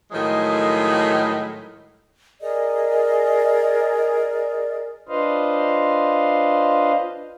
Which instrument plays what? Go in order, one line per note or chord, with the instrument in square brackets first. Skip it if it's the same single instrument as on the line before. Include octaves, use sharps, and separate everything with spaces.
[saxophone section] A2 D#3 F3 F#3 G#3
[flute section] G#4 A#4 D5 D#5
[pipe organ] D4 F4 B4 C5 D#5 F5